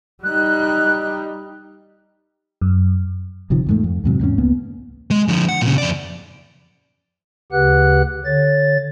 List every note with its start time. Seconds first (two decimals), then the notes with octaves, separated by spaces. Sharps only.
0.23 G3 D#4 F#6
2.61 F#2
3.50 G1 C3 D#3 F3
3.66 E2 G#2 A3
3.84 F2
4.04 E2 G#2 C3 F#3
4.21 E2 G#2 G#3 C#4
4.38 C#2 A#3 B3
5.11 G#3
5.28 D3 F3
5.49 F#5
5.61 A#2 C#3
5.78 F2 D5
7.52 D2 C#3 G4 B4 F#5 F#6
8.25 D3 C#5 A6